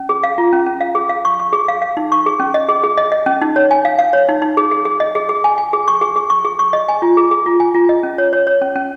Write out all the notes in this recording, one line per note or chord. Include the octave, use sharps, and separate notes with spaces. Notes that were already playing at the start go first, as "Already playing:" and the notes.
Already playing: C#4
G#4
F5
F4
C#4
C#4
F5
G#4
F5
C#6
C#6
G#4
F5
F5
D#4
C#6
G#4
C#4
D#5
G#4
G#4
D#5
D#5
C#4
D#4
C#5
G#5
F5
F5
C#5
D#4
D#4
G#4
G#4
G#4
D#5
G#4
G#4
G#5
G#5
G#4
C#6
G#4
G#4
C#6
G#4
C#6
D#5
G#5
F4
G#4
G#4
F4
G#5
F4
D#5
C#4
C#5
C#5
C#5
C#4
C#4